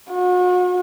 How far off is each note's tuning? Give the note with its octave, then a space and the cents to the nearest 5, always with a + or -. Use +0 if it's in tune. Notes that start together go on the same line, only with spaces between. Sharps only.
F#4 -40